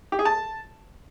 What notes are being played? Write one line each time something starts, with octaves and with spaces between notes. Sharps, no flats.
G4
G#4
A5